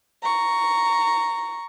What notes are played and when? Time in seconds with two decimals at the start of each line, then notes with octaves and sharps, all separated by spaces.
0.23 A#5 C#6